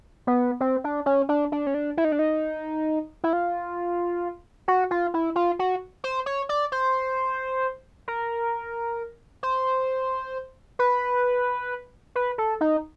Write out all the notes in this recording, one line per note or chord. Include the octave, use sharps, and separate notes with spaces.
B3
C4
D4
C#4
D4
D4
C#4
D4
E4
D#4
D4
D#4
E4
F4
F#4
F4
E4
F4
F#4
C5
C#5
D5
C5
A#4
C5
B4
B4
A4
D#4